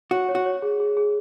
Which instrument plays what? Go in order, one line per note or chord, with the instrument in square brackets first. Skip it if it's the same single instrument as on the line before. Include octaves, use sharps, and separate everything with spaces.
[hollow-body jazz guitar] F#4 [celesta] C#5
[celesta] C#5
[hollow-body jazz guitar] F#4
[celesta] C#5
G#4
G#4
G#4